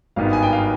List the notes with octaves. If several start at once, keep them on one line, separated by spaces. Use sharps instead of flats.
G#1 G2 D#3 B3 D#4 F5
G#5
G5
F5